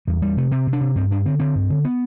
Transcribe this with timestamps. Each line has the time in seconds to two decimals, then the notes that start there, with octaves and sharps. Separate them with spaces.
0.07 E2 G3
0.21 E2 G3
0.37 C3 A3
0.51 C3 C4
0.67 C3
0.73 D4
0.81 C3
0.95 G2 C4
1.11 G2 D4
1.25 D3 C4
1.40 D3 C4
1.55 G2
1.70 D3
1.85 B3